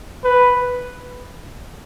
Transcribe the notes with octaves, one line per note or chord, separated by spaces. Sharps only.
B4